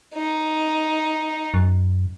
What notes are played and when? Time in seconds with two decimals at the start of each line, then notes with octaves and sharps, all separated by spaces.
0.15 D#4
1.54 F#2